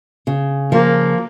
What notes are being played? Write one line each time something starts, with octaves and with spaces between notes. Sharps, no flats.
C#3
F3 A#3